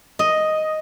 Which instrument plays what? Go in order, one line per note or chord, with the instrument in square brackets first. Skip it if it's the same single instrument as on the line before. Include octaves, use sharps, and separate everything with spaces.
[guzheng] D#5